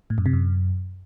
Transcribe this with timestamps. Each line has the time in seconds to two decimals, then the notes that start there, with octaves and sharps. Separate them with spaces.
0.10 A2
0.18 F#2
0.26 C3
0.33 F#2